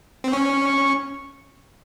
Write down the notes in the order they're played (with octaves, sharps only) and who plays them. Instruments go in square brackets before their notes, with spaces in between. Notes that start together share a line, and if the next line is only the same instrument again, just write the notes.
[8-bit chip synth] C4
[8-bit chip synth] C#4 [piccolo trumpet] C#6
[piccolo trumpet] C#6